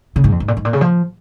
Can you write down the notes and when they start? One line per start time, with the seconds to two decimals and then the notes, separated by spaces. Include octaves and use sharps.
0.16 C#3
0.24 G#2
0.32 F2
0.40 G#2
0.48 A#2
0.57 G#2
0.65 A#2
0.73 C#3
0.81 F3